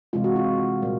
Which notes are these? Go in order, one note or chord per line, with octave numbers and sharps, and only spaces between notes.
C3 E3 G#3 F4
F#4
F4
A#2 G3 A#3